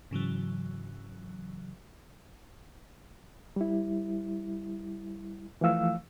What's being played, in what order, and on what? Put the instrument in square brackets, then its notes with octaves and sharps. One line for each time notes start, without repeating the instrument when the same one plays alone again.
[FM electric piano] G#2 C#3 E3 F#3
[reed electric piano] G3 E4
E3 F3 A3 F5 E6